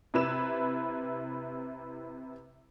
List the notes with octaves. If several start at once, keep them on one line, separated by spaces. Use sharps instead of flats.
C3 E4 B4 E7